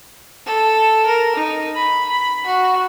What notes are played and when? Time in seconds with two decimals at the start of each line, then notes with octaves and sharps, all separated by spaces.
0.46 A4
1.06 A#4
1.35 D#4
1.75 B5
2.08 B5
2.46 F#4